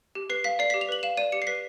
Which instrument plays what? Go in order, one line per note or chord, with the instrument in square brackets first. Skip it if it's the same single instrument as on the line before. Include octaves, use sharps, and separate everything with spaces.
[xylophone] G4
B4 C7
F5 B6
D5 C7
G4 B6
F7
B4 F#7
F5 E7
D5 D#7
G4 C#7
C7
B4 B6